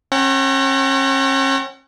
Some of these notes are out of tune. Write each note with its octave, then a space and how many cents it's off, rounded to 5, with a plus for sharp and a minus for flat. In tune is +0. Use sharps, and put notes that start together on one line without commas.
C#4 -40 F#5 +35 A#5 -40